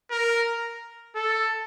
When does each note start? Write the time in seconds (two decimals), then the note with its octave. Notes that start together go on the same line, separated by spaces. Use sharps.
0.11 A#4
1.15 A4